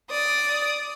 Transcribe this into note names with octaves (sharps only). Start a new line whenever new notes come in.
D5 D#6